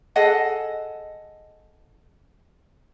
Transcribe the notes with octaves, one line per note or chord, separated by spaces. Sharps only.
G#4 A4 D#5 F#5